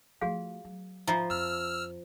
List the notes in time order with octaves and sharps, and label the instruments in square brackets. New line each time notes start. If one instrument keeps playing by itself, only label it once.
[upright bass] F3 A3 [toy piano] F#4 G#4 F5
[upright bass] F#3
[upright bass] G#2 D#3 [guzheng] F3 [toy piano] E5 A#5 B5
[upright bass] F2 [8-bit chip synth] E6 F6